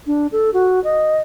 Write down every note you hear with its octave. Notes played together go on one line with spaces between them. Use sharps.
D4
A4
F#4
D#5